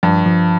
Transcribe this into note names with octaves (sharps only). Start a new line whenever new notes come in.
G2 F3
F3